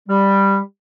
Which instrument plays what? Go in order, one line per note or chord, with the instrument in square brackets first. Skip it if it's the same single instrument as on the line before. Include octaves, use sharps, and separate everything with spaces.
[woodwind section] G3